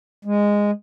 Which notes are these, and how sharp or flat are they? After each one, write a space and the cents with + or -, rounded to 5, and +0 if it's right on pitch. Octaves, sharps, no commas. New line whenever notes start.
G#3 -10